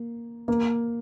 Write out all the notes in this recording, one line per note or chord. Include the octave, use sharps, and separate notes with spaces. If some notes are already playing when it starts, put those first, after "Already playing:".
Already playing: A#3
A#3